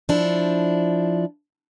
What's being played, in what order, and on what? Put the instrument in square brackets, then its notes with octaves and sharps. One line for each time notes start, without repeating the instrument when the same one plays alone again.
[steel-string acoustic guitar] F3 D4 E4